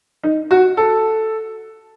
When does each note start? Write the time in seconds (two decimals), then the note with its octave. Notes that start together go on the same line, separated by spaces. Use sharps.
0.23 D#4
0.51 F#4
0.77 A4